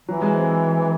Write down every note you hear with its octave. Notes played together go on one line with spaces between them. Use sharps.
E3 F#3
G#3
C4